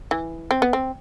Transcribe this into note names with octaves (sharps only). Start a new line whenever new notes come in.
E3
C4
B3
C4